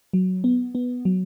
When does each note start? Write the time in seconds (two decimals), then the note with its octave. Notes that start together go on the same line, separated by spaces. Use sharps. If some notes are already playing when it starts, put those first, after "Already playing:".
0.13 F#3
0.44 B3
0.75 B3
1.05 F#3